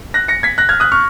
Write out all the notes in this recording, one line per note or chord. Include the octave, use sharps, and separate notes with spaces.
F#6 A#6
A#6 C#7
G#6 B6
F#6 A#6
F6 G#6
D#6 F#6
C#6 F6